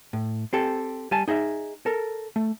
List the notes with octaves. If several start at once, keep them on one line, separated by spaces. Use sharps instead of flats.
A2
C4 G4 A4
G3 G#5 A5
D#4 G#4 D#5 E5
A4 A#4
A3